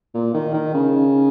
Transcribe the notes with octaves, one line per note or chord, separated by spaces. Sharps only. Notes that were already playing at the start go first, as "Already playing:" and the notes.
A#2
D#3
D#3
C#3